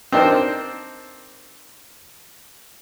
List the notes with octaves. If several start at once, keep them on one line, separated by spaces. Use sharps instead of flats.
C4 D4 D#4 A#4 C5